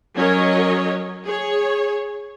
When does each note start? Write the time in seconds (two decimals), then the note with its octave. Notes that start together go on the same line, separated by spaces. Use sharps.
0.15 F#3 C#4 A#4 C#5 D#5
1.23 G#4 C#5